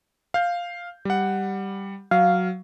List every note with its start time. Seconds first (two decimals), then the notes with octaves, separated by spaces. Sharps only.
0.34 F5 G6
1.05 G3 F#5
2.11 F#3 F5